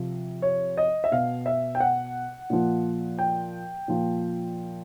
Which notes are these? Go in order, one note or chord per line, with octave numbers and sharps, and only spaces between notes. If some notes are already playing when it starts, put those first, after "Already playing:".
Already playing: C3 F3
C#5
D#5
E5
B2 F5
E5
G5
F#5
A#2 F3
G5
A#2 F3